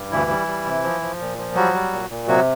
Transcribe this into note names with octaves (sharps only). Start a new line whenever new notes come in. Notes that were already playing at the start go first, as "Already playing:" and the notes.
Already playing: G2
D2 E3 E4
G3
G3
C3
F3
F3
A#2
F3
F#3 G3 F#4
G3
A#2
A#2
C3 F#3 F#4